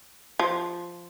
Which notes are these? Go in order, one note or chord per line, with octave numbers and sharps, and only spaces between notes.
F3